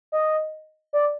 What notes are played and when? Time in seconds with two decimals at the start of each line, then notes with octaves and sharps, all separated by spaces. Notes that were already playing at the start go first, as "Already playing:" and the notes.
0.12 D#5
0.93 D5